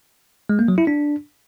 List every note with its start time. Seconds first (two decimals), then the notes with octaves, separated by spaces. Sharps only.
0.49 G#3
0.59 A#3
0.68 F#3
0.78 E4
0.87 D4